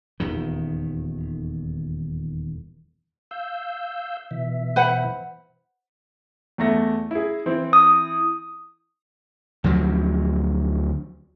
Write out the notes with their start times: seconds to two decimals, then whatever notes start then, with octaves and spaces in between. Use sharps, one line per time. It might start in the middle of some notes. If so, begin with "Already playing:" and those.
0.20 D#1 E2 D#3
3.31 F5 E6 G6
4.31 B2 E3 E5
4.76 B4 C5 F#5
6.58 E2 A3 A#6
7.11 E4 G#4
7.46 E3 C4 E4
7.73 D#6
9.64 D2 F3 F#3